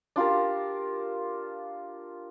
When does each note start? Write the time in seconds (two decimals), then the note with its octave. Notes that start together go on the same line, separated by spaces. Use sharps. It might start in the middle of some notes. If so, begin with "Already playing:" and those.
0.16 D4 F4 G4 A#4